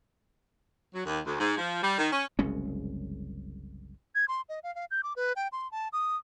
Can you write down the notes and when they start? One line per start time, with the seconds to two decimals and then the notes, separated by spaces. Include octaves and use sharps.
0.93 F#3
1.05 D#2
1.25 D2
1.39 G#2
1.57 F3
1.83 G3
1.98 D#3
2.12 C#4
2.39 F#1 C2 G#3 C#4
4.15 G#6
4.28 C6
4.49 D#5
4.63 F5
4.75 F5
4.91 G6
5.03 D6
5.16 B4
5.36 G5
5.52 C6
5.72 A5
5.93 D#6